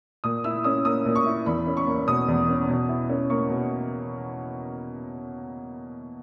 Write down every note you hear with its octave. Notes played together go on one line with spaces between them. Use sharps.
A#2 D#6
E4 E6
C#4 D#6
A#3 D#6
A#2
C#6
E4
E2 B5
C#4
C#6
A#3
B2 D#6
E2
C#4
B2
E4
C#4
A#3 C#6
B2